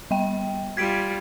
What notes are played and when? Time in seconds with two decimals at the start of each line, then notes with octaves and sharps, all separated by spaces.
0.11 G3 G5
0.77 G3 F4 G#6 B6 D7